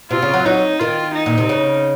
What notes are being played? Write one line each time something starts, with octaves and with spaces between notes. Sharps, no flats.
C3 F4
C#3
F#3
F#3 D#4
D#3 F4
D#4
A#2
C3
C#3